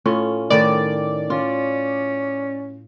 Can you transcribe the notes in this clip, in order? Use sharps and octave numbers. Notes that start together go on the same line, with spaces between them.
A2 C#4 F4
A2 D#3 D5
C#4 F4